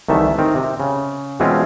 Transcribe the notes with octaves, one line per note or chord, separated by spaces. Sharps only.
C2 D#3 E3 A3 E5
D#3 C4 D#4 A#4
C3
C#3
B2 E3 G#3 C4 C#4 F4